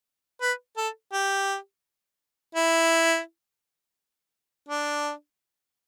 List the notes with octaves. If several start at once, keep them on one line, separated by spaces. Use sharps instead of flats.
B4
A4
G4
E4
D4